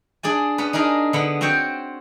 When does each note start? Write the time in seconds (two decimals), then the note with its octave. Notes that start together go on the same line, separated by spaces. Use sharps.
0.23 D4 G#4 D5 G#5
0.58 B3 C#4 B4
0.73 D4 D#4 G#4 A#4 D#5
1.13 D3 B3 B5
1.41 C4 F#4 C5 C#5 G5